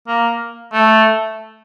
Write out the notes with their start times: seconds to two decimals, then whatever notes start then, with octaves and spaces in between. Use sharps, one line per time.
0.08 A#3
0.73 A3